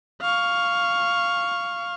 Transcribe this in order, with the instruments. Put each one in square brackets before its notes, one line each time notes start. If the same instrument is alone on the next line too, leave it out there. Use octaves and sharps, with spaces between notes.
[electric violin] F5 C#6